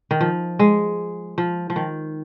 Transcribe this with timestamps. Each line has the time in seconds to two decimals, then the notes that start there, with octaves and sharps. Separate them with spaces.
0.11 D#3
0.21 F3
0.59 G#3
1.38 F3
1.70 F3
1.76 D#3